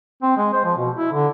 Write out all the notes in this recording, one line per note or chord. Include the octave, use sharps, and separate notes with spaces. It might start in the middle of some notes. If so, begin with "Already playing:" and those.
C4
G#3
C5
F3
B2
E4
D3